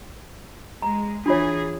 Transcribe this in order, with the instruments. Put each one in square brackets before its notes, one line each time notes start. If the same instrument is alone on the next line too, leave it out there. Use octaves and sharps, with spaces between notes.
[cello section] G#3 [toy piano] A#5
[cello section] E3 G#4 [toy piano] D4 F4 C#5